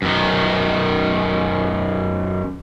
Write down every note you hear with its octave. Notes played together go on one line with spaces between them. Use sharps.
F#2 D#3